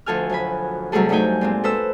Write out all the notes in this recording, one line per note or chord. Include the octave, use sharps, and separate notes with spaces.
D2 F3 A4 G#5 F6
F#2 F3 G#5 B5
C3 F#3 G3 A3 G#4 A4
G2 F#3 A3 D#4 G5 G#5
A#2 G#3 C4
A4 B4 C5 E6